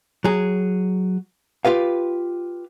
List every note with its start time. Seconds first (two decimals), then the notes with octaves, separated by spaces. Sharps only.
0.24 F#3 G#4
1.65 F4 G4 B4 F5